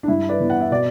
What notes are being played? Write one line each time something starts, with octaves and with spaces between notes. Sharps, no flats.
D4
G2 E4
B4 D5
E3 B3
F#5
E5
B2 D5